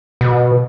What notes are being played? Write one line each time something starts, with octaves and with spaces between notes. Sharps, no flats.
B2